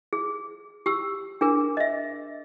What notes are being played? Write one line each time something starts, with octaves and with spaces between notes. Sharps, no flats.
G#4
G4 E6
D4 G#4 A#4
D#5 E5